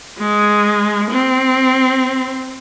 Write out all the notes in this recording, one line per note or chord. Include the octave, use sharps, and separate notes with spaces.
G#3
C4